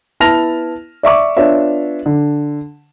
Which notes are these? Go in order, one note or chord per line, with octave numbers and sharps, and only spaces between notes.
B3 E4 A5 F6 A#6 F7
D5 E5 C#6 D6
B3 D4 F4 C#5 E5
D3